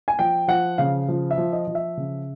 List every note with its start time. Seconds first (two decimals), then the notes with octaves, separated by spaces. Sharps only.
0.08 G#5
0.19 F3 G5
0.48 F3 F#5
0.78 C#3 F5
1.08 F3
1.31 E5
1.38 F3
1.53 D#5
1.67 F3
1.75 E5
1.97 C#3